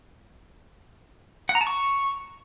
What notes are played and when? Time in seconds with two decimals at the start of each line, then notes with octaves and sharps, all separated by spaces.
1.49 F#5
1.55 A#5
1.61 A5
1.67 C#6